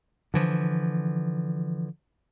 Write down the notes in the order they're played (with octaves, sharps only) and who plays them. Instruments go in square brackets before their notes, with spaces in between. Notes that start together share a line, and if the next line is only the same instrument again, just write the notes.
[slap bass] D3 E3 F3